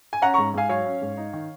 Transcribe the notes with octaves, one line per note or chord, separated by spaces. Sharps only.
G#5
C#4 F#5 A#5
G#2 A#5 C#6
G#2 F5 G#5
F#3 C#5 F5
C#4
G#2
D#4
D#3